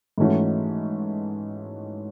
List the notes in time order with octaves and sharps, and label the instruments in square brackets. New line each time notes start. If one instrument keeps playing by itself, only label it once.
[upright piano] G#2 E3 A3 C#4 F#4